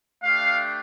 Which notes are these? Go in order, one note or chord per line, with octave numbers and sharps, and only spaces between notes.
A3 D4 G4 F5